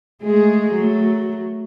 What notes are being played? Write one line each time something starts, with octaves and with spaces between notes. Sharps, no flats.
G#3 A3 G#4
F#3 A3